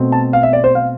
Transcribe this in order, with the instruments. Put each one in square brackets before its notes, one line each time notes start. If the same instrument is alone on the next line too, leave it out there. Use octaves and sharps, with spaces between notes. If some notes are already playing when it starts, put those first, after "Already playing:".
Already playing: [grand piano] B2 A3 C4
A5
F5
E5
D5
C5
F5